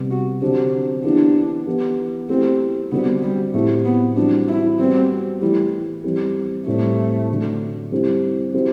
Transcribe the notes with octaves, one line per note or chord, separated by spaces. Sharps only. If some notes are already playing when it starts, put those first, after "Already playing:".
Already playing: C3 G3 B3
F#4
D3 F#3 C4 D4 G4
E3 B3 D4 E4 G4
E3 B3 E4 G4
F#3 A3 C4 E4 G4
D3 G3 B3 C4 F#4
G3
A2 F#3 A3 C4 E4 G4
B3
E3 G3 C4 D4 F#4
E4
G3 B3 C4 F#4
E3 G3 A3 E4 G4
E3 G3 C4 G4
A2 G3 A3 C4 E4
D3 F#3 A3
G3 C4 E4 G4
F#3 C4 E4 G4